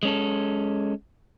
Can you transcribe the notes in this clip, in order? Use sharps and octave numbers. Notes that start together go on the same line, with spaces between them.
G#3 C#4 A4